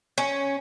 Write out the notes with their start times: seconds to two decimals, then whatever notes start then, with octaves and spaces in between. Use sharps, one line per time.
0.18 C#4